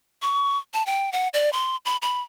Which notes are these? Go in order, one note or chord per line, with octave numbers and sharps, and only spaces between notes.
C#6
A5
G5
F#5
D5
C6
B5
B5